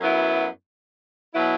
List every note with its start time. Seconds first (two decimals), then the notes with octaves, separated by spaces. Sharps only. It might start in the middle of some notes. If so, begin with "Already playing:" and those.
0.01 F#2 F#3 B3 E4
1.34 B2 F#3 B3 E4